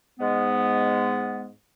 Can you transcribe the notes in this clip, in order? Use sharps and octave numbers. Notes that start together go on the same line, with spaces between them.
G#2 G#3 B3